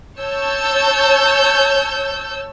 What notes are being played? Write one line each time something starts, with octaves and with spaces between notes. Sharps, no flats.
C#5 A5 E6 G6